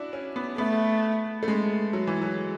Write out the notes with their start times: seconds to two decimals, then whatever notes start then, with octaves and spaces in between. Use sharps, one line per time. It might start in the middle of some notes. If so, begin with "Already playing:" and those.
Already playing: D4 E4 F#4
0.13 C#4
0.36 B3
0.58 A3 B3
1.43 A3
1.48 G#3
1.93 F#3
2.07 E3
2.21 F#3